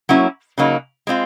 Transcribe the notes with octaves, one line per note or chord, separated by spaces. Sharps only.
F#3 A#3 C#4 E4
C#3 F#3 A#3 D#4
G#3 C4 F4